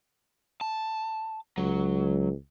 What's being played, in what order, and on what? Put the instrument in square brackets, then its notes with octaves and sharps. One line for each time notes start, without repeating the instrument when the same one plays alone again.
[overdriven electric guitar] A5
[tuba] C#2 [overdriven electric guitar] F#3